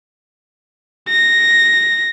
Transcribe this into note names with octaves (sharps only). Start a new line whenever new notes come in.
A#6